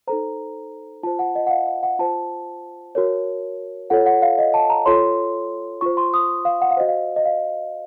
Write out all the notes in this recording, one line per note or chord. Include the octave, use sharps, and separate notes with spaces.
D#4 A4 C5 A#5
F4 C5 A5
F#5
D#5
F#5
F5
F5
F#5
F4 C5 A5
F#4 A#4 C#5
F4 A4 C#5 F#5
F#5
F5
D#5
A5
A#5
F4 A4 C#5 C6
F4 C5 C#6
C6
D#6
F5
F#5
F5
F#4 C5 D#5
F5
D#5
F5